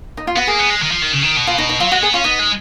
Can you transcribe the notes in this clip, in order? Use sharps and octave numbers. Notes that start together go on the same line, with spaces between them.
D#4
F4
B3 F#4
A#3 G#4
B3
G#3
D#3
F3
D#3
C#3
D#3
B2
F4
D#4
D#4
F#3 F4
G#3 F#4
B3 G#4
C#4 F4
B3 D#4
G#3